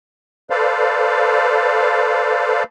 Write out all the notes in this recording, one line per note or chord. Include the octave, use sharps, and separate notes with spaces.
A4 B4 C5 D5 F5